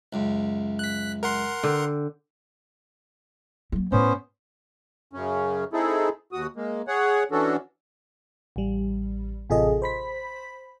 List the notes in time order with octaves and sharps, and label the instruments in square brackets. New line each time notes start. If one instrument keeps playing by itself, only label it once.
[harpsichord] C#2 F#2
[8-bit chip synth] F#6 B6
A#4 F#5 C6
[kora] D3 G5
[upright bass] F#3 A#3
[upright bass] A2 [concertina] B3 C#4 C5
[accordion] F#2 C#3 C#4
C4 D#4 E4 G#4 A4
D#2 F#4 D#6
G#3 A#3
G#4 C#5 F#5
E3 C#4 D4 F#4 A4
[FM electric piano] A1 G3
A1 C3 F4 G#4 A4 D#5
C5 B5 B6